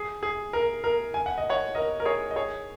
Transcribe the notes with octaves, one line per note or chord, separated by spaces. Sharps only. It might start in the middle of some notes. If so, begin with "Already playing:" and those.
Already playing: G#4
G#4
A#4
A#4
G#5
F#5
D#5
C#5 F#5
A#4 D#5
A#4
G#4 C#5
D#5
G#4 C#5